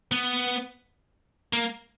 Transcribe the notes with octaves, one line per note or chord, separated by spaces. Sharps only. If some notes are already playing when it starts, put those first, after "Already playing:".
B3
A#3